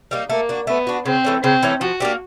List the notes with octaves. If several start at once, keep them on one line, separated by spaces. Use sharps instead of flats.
G3 A#3 D#4
A3 A#3
D4 F#4
A3 B3
D4 F#4
C#3 C4
E3 A3 C#4
C#3 C4
E3 A3 C#4
F3 F#4
A#3 D4 G4